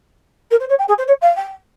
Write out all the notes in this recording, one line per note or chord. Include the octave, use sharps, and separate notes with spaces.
A#4
C5
C#5
G5
G#4
C5
C#5
F5
G5